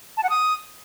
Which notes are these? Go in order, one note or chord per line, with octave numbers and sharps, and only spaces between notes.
A5
F#5
D#6